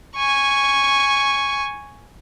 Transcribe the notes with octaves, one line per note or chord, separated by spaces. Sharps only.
G#5 C#6